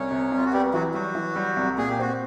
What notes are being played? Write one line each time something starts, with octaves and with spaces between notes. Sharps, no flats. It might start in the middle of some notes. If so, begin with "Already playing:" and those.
Already playing: C2 C#4 C#5
C3
C2
F4
F#4
G3 B3 G4
E3 F#3 F#4
F#3 G3 F#4
E3
G3
C2
A#2 G#4
G4
C4 F#4